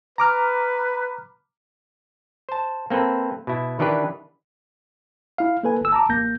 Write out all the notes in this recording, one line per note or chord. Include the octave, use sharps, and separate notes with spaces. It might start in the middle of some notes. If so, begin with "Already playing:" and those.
B4 A#5 D6 F6
C5 A5
A#3 C4 A4 B4
B2 E4
D#3 E3 D4 G4 B4
E4 F5
A#3 A4 B4 G#5
G1 E6
A5 A#5 D6
A1 A#3 G6 A#6